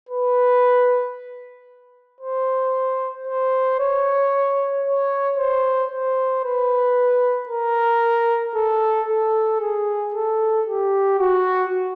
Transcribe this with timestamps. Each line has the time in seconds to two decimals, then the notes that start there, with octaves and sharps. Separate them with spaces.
0.09 B4
2.21 C5
3.27 C5
3.79 C#5
4.85 C#5
5.38 C5
5.92 C5
6.44 B4
7.49 A#4
8.55 A4
9.08 A4
9.60 G#4
10.14 A4
10.67 G4
11.19 F#4